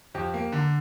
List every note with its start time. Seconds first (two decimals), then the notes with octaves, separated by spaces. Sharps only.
0.14 F2 G4
0.34 A#3
0.52 D3